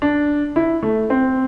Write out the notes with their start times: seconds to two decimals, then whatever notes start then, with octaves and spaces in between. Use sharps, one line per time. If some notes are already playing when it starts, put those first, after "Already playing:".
0.02 D4
0.56 E4
0.83 A3
1.10 C4